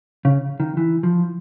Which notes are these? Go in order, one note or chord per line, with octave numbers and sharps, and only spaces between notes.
C#3
D#3
E3
F3